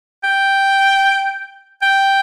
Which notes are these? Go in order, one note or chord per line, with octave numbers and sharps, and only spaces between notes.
G5
G5